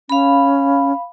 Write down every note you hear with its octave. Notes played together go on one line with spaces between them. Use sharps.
C#4 F5 B5